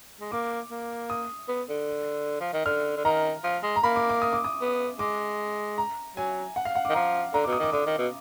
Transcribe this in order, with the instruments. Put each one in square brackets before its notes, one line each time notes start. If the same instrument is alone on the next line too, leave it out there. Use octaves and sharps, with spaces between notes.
[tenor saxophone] G#3
[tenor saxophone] A#3 [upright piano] D6
[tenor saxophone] A#3
[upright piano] D#6
[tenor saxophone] B3
D3
F3
D#3
[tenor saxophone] D3 [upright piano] F6
[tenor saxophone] D3
[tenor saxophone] D#3 [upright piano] A#5
[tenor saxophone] F3
G#3
[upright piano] A#5
[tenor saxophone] A#3 [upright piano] B5
[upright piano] D6
D6
D#6
D6
D#6
[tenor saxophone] B3
[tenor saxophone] G#3 [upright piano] D6
[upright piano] A#5
[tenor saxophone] F#3 [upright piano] G#5
[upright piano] F#5
F5
F#5
D6
[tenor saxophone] D#3
[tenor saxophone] F3 [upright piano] A#5
[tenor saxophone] D3 [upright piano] A#5
[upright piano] D6
[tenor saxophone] B2
[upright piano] D#6
[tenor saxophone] D#3 [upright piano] D6
[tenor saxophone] D3 [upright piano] D6
[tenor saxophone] D#3
B2